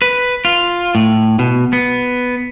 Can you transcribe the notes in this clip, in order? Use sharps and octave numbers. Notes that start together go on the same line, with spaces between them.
B4
F4
A2
B2
B3